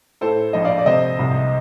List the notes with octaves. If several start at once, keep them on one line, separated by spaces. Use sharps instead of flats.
A2 A4 C5
A#1 D#5
D5 F5
D5
C3 C5 D#5
C2